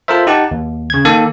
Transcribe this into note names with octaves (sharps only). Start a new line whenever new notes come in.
F4 A4 A#4 C5 E5
D#4 G4 F#5 A5
D#2
C#3 G#6
D#3 A#3 A4